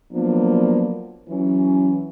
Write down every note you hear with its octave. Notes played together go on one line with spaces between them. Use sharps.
F3 F#3 A#3 B3 D4
E3 F#3 C#4